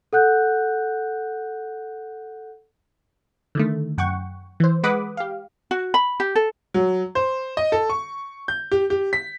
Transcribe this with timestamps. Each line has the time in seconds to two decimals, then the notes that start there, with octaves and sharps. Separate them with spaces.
0.13 A4 F#5 F#6 G6
3.55 D3 D#3 A3
3.98 F#2 F#5 G5 C#6
4.60 E3 C5
4.83 G#3 B4 F#5 B5 D6 D#6
5.17 G4 F5
5.71 F#4
5.94 B5
6.20 G4
6.35 A4
6.74 F#3
7.15 C5
7.57 D#5
7.72 A4
7.90 C#6
8.48 G6
8.72 G4
8.90 G4
9.13 B6